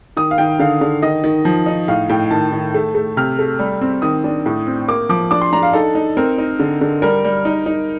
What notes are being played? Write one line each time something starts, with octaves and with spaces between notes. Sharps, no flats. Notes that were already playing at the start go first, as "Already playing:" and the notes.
D#3 D#6
F5
D#3 G5
D3 F5
D3
D#3 D#5
D#3
F3
D#4
A2 F5
A2 G5
D#3 A5
D#3
A3
A3
C3 F6
A3
G3
C4
D#3 D#6
D4
A2
C4
A#3 D6
F3 D6
D4 D6
C6
D4 A#5
F5
D#4 A4
D#4
C4 A#4
D#4
D3
D3
G3 A#4
G3
D#4
D#4